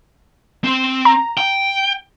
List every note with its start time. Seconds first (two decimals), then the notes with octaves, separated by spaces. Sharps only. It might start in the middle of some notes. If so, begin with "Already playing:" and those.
0.64 C4
1.05 A#5
1.38 G5